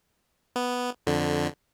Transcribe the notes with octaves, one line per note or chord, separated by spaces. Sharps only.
B3
F2 D3